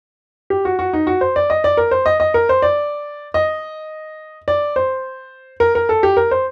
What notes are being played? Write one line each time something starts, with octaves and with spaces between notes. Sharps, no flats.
G4
F#4
F#4
D#4
F#4
C5
D5
D#5
D5
A#4
C5
D#5
D#5
A#4
C5
D5
D#5
D5
C5
A#4
A#4
A4
G4
A#4
C5